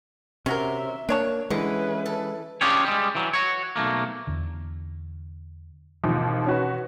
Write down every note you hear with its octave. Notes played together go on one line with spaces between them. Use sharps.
C3 C#4 F#4 A#4 E5 C6
A#3 D4 C#5 A5
D3 E3 G#3 C#4 B4
A4
C#4 D4 F4 G4 G#4 C#5
G3 G#3
E3 F#3
F#4 C#5
B1 A3 A#3
E2 D3
G#1 D#2 B2 E3 F3
C#4 F#4 B4